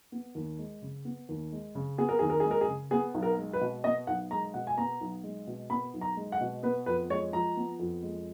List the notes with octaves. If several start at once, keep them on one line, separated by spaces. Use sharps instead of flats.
B3
D#2
G#3
C#3
B3
D#2
G#3
C#3
B3 G#4
A#4
D#2 G#4
A#4
G#4
G#3
A#4
G#4
C#3
B3 G#4
B1
A#4
G#3
B4
B2
B3 D#5
B1 F#5
G#3 A#5
B2 F#5
G#5
B3 A#5
B1
G#3
B2
B3 B5
B1
A#5
G#3
F#5
B2
B3 B4
F2 B4
G#3 C#5
F3 A#5
B3
F2
G#3